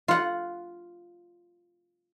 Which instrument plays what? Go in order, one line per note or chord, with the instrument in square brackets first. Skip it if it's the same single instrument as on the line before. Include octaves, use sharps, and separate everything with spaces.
[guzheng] F4 F#5